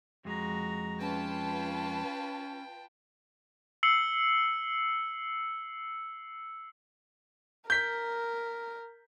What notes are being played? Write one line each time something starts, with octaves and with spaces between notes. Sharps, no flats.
F2 G#3 F#4 A#5
C#4 F4 B4 G5 A5
E6 C7 C#7 F#7
A#4 G6 B6